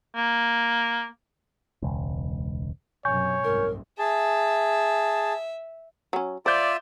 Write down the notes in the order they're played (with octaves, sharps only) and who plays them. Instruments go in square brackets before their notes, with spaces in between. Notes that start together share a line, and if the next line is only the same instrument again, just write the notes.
[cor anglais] A#3
[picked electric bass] E1 C#2
[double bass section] B1 F#2 C3 [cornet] C#5 [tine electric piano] G#5 C#6 G6
[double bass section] F#1 C2 G#2 [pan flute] A#4
[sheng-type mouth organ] G#4 A5 [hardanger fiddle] E5
[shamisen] F#3 C#4
[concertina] F4 E5 [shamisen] C5 [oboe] D5 [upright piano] D6 G6